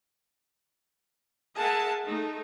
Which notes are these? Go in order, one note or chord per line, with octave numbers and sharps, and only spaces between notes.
G#4 A#4 E5 F#5 G#5 A5
A3 D#4